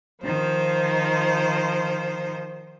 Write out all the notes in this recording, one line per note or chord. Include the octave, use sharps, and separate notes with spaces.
D#3 F3 C5